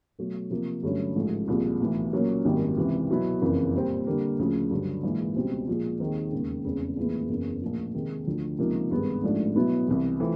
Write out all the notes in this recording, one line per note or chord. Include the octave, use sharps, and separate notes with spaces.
B2 F#3 A3
C3 F3 A#3
G2 D3 F#3 A3 C#4
A1 G#2 F3 A3
C2 A#2 F3 G#3
B1 A2 E3
A#2 F#3 A#3 C#4
G#1 F#2 D#3 G3 A#3
C#2 C3 E3
B2 F#3 B3 E4
F#1 F2 C#3 E3
A#2 G3 C4
D3 G3 A#3
D2 C#3 F3
G2 D3 F#3
A#1 G#2 E3 G#3
C#2 B2 G3 C4
A#2 F3 G#3
D#2 D#3 G#3 C4 D#4
E1 D#2 C#3
F1 E2 C#3
A#1 A2 E3 G#3 B3
F#1 E2 C#3
A#1 A2 F3
C3 D#3 G#3
D2 D3 F3
C#2 C3 F3 A#3 D#4
G#1 G2 D#3 G#3 B3
A1 G#2 F3 A3 D4
B2 F#3 B3 E4
C2 C3 E3
E3 A3 C4 F4